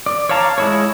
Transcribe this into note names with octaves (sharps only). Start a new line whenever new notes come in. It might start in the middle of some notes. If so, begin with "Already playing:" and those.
D5
C#5 D5 F5 A5 A#5
G#3 E4 C#5